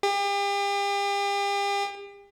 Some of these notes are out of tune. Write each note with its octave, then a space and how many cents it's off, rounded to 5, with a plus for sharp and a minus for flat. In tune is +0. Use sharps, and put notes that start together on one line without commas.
G4 +40